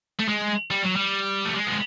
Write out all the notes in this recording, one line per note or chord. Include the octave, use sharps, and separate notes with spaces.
A3
G#3
G3
F#3
G3
A3
G#3
B3